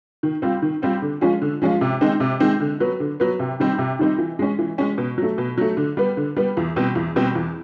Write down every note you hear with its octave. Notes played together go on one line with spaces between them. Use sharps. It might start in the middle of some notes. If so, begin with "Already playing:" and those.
D#3
G3 C4 F4
D#3
G3 C4 F4
D3
F3 G#3 C#4 F4
D3
F3 G#3 C#4 F4
C3
D#3 G#3 C4 D#4
C3
D#3 G#3 C4 D#4
D3
F#3 B3
D3
F#3 B3
C3
D#3 G3 C4 D#4
C3
D#3 G3 C4 D#4
E3
G#3 C#4
E3
G#3 C#4
B2
F#3 A3
B2
F#3 A3
D3
G3 B3
D3
G3 B3
E2
B2 G3 C4
E2
B2 G3 C4
E2